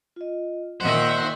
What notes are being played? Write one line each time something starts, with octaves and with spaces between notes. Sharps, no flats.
F4 D#5
A#2 D#3 C5 D#5 E5 F#5